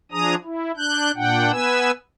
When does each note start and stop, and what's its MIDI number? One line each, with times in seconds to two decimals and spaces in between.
0.12 0.35 53
0.12 0.35 62
0.12 0.35 68
0.12 0.35 82
0.12 0.35 87
0.44 0.72 64
0.77 1.11 62
0.77 1.11 90
0.77 1.11 91
1.16 1.52 46
1.16 1.52 62
1.16 1.52 78
1.16 1.52 79
1.52 1.91 59
1.52 1.91 71
1.52 1.91 80
1.52 1.91 88